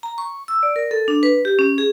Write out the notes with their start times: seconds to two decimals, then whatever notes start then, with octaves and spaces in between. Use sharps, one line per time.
0.03 A#5
0.18 C#6
0.48 E6
0.63 D5
0.76 A#4
0.91 A4
1.08 D4
1.23 B4
1.45 G4
1.59 C#4
1.78 G#4